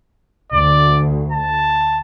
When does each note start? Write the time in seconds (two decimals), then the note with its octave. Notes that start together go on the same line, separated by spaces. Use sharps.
0.52 D2 D5
1.32 A5